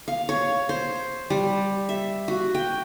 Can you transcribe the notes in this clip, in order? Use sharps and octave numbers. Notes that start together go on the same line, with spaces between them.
F5
C#5
C5
G3
E5
F#4
G5